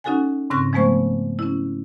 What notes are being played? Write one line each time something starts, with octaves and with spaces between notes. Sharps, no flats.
C#4 D#4 F#4 A4 F#5 G#5
G#2 C#3 C4 C#6 F#6 A#6
F3 G#3 A3 B3 C5 C#6
C#4 E4